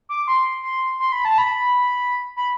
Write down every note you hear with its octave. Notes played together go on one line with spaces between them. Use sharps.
D6
C6
C6
C6
B5
A5
B5
B5